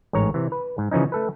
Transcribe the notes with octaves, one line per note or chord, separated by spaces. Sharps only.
A1 G#2 C#5 A#5
C3 E3
B4
G#2
C#3 E3 F3 C#4 D#4
A3 A4 B4